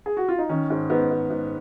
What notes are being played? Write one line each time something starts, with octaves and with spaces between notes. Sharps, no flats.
G#4
F#4
F4
D#4
D#3 C#4
G#2
G#2 B3
G#2
G#2